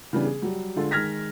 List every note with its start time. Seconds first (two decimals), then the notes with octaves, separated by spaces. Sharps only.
0.13 C#3 E3 G3 B3 D4
0.25 G#4
0.42 F#3 G3
0.76 D3 G#3 F4 A4
0.91 D#3 G#3 F6 G#6 A#6 B6